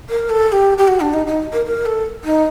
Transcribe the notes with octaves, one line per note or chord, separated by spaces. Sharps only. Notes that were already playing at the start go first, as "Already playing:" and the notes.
A#4
A4
A4
G4
G4
F#4
D4
D#4
D#4
A#4
A#4
A4
D#4